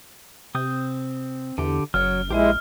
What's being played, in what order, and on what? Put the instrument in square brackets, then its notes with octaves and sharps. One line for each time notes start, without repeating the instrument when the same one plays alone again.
[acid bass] C3 [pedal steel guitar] C4 D#6 G6
[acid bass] E2 [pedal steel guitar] D3 G4
[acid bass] F#1 [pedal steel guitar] F#3 C#5 [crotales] F6
[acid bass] A#1 [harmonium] G#3 E4 [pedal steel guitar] G4 C5 G#5